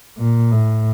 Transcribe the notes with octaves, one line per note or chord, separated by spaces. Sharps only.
A#2
A2